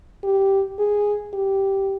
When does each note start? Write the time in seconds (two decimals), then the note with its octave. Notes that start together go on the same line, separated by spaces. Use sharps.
0.24 G4
0.79 G#4
1.34 G4